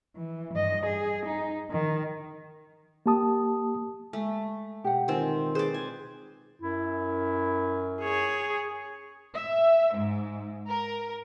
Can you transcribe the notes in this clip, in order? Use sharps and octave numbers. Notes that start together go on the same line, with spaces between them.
E3
G2 D#5
G#4
D#4
D#3
A#3 G4 A5 D#6
G#3 A3
B2 G4 F#5
D#3 C4 F4 G#5
G#4 B4 C5 D5
G#5
F#2 E4
G#4 C#5
E5
G#2
A#4